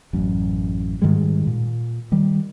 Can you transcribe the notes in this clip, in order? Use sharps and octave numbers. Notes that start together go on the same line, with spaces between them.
A1 F#2
G#2 D#3 G3 G#3
A#2
D#3 G3